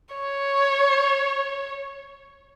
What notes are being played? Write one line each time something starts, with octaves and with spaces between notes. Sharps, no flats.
C#5